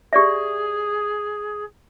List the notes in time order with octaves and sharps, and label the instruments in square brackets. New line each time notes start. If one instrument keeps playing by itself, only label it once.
[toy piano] G4 D5 E5 [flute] G#4